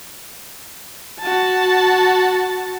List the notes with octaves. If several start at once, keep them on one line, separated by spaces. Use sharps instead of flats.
F#4 A5